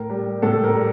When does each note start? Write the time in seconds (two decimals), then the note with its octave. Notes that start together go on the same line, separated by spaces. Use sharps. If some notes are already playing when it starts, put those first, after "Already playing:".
Already playing: A2 A#4
0.10 G3
0.42 A2 A4
0.64 A#4
0.75 G3